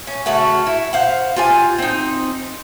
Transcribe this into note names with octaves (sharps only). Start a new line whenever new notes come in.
C#4
C#3 A3 F#4
E4
C5 F5 F#5
F4 G4 G#5
C4 D#4